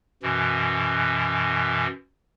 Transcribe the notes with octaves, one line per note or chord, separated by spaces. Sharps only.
F#2 B2 E3